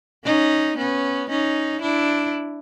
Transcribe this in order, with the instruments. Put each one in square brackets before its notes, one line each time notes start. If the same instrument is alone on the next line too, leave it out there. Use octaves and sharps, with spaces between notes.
[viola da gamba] C#4 D#4
B3 C#4
C#4 D#4
D4 E4